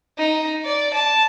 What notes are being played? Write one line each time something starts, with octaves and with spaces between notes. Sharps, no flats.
D#4
D5
A5